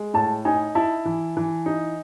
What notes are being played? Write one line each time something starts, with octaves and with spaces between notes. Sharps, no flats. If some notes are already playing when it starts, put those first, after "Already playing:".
Already playing: G#3
A2 A5
D#4 G#5
E4 A5
E3
E3
D#4